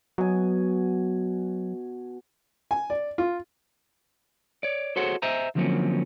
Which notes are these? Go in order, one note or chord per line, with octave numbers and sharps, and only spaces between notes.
B2 F#3 G#5
G#5
D5
F4
C#5 D5
F#4 G#4 A4 C5 C#5 F#5
C5 D#5 E5 G#5 A#5
D3 F3 F#3 A#3 C4 C#4